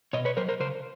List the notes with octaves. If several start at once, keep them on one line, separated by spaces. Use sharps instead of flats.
B2 C#5 D#5
B4 C#5
F#3 A#4 C5
A#4 C5
C#3 A#4 C5